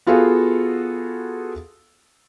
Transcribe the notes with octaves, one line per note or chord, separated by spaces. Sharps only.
B3 F4 F#4 G#4 A4 F5